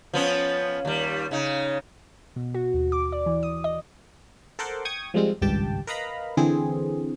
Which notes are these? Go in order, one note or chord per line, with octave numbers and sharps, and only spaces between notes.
F3 B3 C#4
D#2 G3
C#3 D#4
B2
F#4
D#2
D6
D5
E3
D#6
D#5
A4 A#4 C5 F#5 C6 D6
G5 C#6 D#6 G#6
F3 G3 G#3 C4 F4
G#1 C#2 G2 G4 G5 A5
A#4 B4 D#5 F5 A#5 B5
D3 E3 C4 G#4